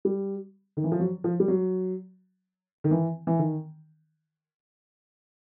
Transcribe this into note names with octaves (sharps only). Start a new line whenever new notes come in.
G3
D#3
E3
F3
F#3
F3
G3
F#3
D#3
E3
E3
D#3